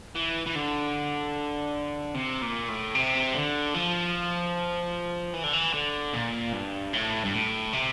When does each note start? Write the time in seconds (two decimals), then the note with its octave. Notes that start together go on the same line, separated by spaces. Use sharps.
0.15 E3
0.47 E3
0.56 D3
2.15 C3
2.42 A#2
2.69 A2
2.95 C3
3.35 D3
3.74 F3
5.34 E3
5.44 D3
5.53 E3
5.74 D3
6.14 A#2
6.54 G2
6.93 A2
7.25 G2
7.33 A2
7.73 C3